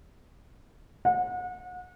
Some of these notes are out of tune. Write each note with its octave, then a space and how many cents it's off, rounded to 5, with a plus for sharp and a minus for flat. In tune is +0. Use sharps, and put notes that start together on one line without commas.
F#5 -35